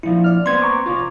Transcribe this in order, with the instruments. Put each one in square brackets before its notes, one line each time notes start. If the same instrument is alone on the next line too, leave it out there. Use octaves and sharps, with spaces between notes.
[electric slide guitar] A#2 F3 [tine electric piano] E4
[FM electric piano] D5 F6
[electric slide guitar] B3 C4 [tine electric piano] C6 G#6
[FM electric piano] A#5 C#6 D6
[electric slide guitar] C3 F4